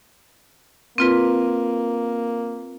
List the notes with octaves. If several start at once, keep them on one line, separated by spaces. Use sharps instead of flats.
A#3 C4 F4 B4